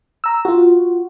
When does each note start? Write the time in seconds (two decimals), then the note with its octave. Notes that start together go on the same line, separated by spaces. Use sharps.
0.24 A#5 E6
0.45 F4 F#4